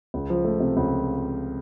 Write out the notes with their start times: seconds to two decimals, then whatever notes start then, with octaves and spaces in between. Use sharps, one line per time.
0.14 C#2
0.30 F3
0.44 A3
0.60 C3
0.77 C#2